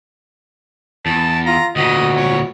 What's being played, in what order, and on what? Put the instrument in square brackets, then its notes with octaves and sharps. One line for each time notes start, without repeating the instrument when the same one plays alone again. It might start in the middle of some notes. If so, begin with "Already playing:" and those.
[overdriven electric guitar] E2 [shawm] A5
[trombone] F4 [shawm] A#5
[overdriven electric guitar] D2 A#2 [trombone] F#4 [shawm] D#5
[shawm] C#5